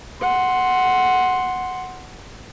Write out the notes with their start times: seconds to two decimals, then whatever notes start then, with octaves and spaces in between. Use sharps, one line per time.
0.21 F#5 C6